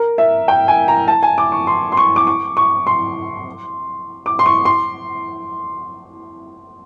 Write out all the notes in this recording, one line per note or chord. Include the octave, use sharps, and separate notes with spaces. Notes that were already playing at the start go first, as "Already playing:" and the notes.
Already playing: A#4
E5
G5
G#5
A#5
A5
G#5
D6
C#6
C6
C6
C#6
D6
C#6
C#6
C6
D6
C6
C#6
C6